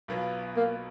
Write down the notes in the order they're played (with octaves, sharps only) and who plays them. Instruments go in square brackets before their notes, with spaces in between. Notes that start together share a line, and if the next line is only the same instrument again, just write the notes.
[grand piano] B1 B2 F#3 B3 F4
[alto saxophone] A#3